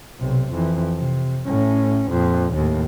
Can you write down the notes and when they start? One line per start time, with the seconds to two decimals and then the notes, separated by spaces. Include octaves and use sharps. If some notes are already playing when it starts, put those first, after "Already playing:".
0.20 B1 C3
0.51 F2 E3
0.97 C3
1.46 A2 C#4
2.10 F2 A#2
2.53 D#2 A2